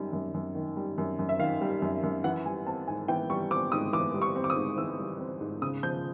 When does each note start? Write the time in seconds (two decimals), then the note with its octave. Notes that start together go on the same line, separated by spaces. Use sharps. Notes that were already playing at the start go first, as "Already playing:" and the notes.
Already playing: F#2 D#3 G3
0.13 F#2
0.34 F#2
0.55 D#3
0.77 G3
0.98 F#2
1.19 F#2
1.29 E5
1.39 D#3 F5
1.61 G3
1.82 F#2
2.03 F#2
2.24 E3 F#5
2.46 G3 G#5
2.67 C4 A5
2.87 G#2 G#5
3.08 E3 G5
3.30 G3 C#6
3.51 C4 D6
3.72 G#2 D#6
3.93 E3 D6
4.14 G3
4.22 C#6
4.36 C4
4.44 D6
4.50 D#6
4.56 G#2
4.78 E3 E6
4.99 G3
5.19 C4
5.41 G#2
5.62 C#3 D#6
5.83 F3 G6